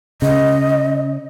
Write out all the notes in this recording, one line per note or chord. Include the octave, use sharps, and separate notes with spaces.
C#3 D#5